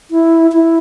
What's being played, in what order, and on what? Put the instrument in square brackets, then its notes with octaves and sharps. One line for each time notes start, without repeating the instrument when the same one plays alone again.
[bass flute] E4
E4